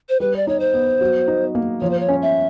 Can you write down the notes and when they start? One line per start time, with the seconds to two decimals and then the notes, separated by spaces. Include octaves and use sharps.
0.09 C5
0.20 G3 B4
0.36 D5
0.47 D#4 C#5
0.60 C5
0.74 B3
1.01 F#3
1.28 D#4
1.55 A#3
1.81 F3 C#5
1.90 C5
2.00 C#5
2.08 C#4
2.22 E5